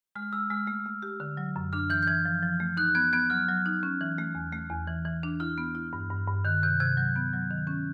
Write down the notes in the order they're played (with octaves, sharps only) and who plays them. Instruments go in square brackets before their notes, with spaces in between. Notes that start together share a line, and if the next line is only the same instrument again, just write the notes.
[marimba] G#3 [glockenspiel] F6
[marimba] G#3 [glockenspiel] E6
[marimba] G#3 [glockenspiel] F6
[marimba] A3
A3
G4
D3
F#3
F#2
[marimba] D4 [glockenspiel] F6
[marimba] E3 [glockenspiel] G6
[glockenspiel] G6
[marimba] E3 [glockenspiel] G#6
[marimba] F3
F3
A3
[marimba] D#4 [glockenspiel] F#6
[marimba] B3 [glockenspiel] G#6
[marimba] B3 [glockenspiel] G#6
[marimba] F#3 [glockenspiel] F6
[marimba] F#3
D#4
C#4
E3
A3
E2
A3
E2
E3
E3
D4
[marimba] E4 [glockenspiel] F6
[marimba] B3
E4
G2
G2
G2
[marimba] D#3 [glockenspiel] F#6
[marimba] C3 [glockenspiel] G6
[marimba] C3 [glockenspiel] G#6
[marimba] F#3 [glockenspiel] G6
[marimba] B3
F#3
D#3
C#4